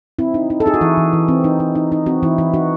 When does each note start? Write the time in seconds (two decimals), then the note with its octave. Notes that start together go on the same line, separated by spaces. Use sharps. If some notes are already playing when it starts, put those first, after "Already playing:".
0.19 C4 E4
0.34 D#4
0.50 D#4
0.60 A4
0.66 D#4 G#4
0.74 F#4
0.81 E3 E4
0.97 E3
1.13 E3
1.28 C4
1.44 D#4
1.60 D#4
1.75 D#4
1.92 D#4
2.06 C4 F#4
2.23 E3 E4
2.38 E3 E4
2.54 D#4 F#4